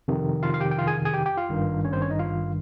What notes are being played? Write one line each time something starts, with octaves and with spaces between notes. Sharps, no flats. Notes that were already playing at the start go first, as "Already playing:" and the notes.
F2 C3 D#3
F4 F5
F5
G4 G5
G5
F4 F5
G#4 G#5
G#4 G#5
G4 G5
G4 G5
F4 F5
G#1 G2 D#3
C#4 C#5
C4 C5
C#4 C#5
D#4 D#5
F4 F5